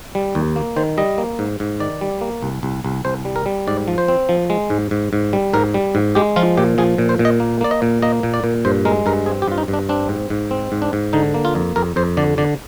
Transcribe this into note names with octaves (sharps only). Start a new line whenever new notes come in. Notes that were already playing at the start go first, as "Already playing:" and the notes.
G3
D#2
A#3
D#3 C5
G3 D#5
A#3
G#2
G#2
D#3 D5
G3
A#3
C2
C2
C2
C2 C5
G3
A#4
G3
G#2 D5
F3
C5
C4
F3
G#3
G#2
G#2
G#2
G3
G#2 A#4
G3
G#2
G#3 G4
F3 F4
A#2 G4
F3 G#4
A#2
C5
A#2
D#5
A#3
A#3 D5
D#5
A#2
A#3 D#5
A#2
D5
A#2
G2 C5
G#3 A#4
G2 A#4
C4 G#4
G4
G2 F4
D#4
G2
D4
C4 D4
G#2
G#2
C4
G#2
D4
G#2
D3 D#4
A#3
F4
F2
F2 A#4
F2 C5
D3 D5
D3 D5